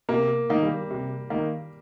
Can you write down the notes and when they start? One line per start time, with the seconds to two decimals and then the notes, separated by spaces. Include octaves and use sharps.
0.09 C3 A#3
0.49 D#3 A#3 D#4
0.63 G3
0.91 C3
1.30 D#3 A#3 D#4